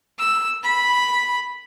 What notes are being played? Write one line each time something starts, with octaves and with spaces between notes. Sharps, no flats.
E6
B5